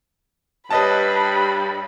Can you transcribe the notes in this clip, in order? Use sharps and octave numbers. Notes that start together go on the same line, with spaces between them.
G2 G4 B4 C#5 D#5 G5 A5 B5